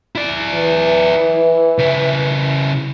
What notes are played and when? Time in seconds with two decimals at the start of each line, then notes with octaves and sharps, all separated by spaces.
0.15 E4 D5
0.54 E3
1.78 C#3 E4